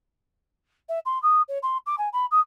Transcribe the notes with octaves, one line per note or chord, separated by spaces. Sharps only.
E5
C6
D#6
C#5
C6
D6
G#5
B5
D#6